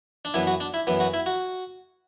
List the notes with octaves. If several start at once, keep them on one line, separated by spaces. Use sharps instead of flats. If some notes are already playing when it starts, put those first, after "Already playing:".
D4
F#2 E3 B3 E4
F#4
D4
E4
F#2 E3 B3
F#4
E4
F#4